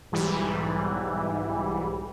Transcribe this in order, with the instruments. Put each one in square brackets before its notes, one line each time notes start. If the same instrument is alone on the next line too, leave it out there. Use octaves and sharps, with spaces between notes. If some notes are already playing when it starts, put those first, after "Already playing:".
[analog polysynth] B1 G#2 E3 G3